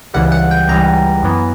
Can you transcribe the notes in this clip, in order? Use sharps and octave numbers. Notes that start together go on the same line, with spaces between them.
C#2 C#3 E3 G3 F#5
F#5
G5
C#2 C#3 E3 G3 A#5
F#2 E3 B3